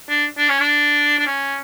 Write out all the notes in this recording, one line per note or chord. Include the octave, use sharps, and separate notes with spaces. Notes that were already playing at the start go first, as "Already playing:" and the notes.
D4
D4
C#4
D4
D4
C#4